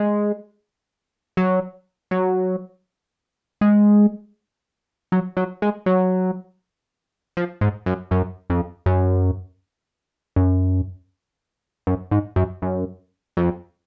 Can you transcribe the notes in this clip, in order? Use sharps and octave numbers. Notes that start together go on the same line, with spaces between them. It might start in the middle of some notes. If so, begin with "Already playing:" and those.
Already playing: G#3
F#3
F#3
G#3
F#3
F#3
G#3
F#3
F3
G#2
F#2
F#2
F2
F#2
F#2
F#2
G#2
F#2
F#2
F2